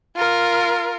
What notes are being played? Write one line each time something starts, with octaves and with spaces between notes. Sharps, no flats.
F4 A#4